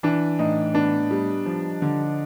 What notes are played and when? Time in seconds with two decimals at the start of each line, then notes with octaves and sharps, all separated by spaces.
0.03 E3 D4
0.39 A2 D#4
0.74 B3 D4
1.11 G3
1.46 F3
1.82 D3